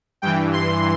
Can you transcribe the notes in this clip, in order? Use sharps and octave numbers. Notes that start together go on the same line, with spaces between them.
G2 E3 G5
C6